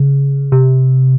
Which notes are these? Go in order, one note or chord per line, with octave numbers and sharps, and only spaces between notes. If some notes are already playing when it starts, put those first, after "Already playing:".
Already playing: C#3
C3